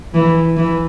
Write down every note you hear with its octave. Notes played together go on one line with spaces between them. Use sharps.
E3
E3